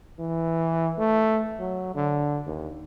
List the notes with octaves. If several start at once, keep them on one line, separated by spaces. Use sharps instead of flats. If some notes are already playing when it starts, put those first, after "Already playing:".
E3
A3
F#3
D3
D#2